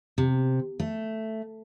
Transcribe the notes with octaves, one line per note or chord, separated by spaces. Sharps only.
C3
A3